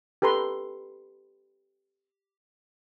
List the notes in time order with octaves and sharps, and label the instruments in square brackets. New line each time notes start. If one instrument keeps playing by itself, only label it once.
[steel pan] G4 A4 B4 A#5 C6